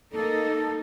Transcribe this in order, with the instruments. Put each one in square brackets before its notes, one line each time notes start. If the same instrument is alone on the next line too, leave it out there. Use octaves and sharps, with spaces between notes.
[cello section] A#3 D#4 [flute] A4